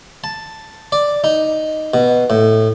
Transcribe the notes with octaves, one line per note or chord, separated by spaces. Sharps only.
A5
D5
D#4
B2
A2